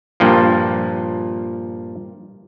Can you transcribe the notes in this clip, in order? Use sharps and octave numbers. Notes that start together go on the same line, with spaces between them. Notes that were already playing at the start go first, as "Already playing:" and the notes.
G2 A#2 F3